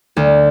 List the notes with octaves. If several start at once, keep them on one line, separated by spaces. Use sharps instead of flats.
D2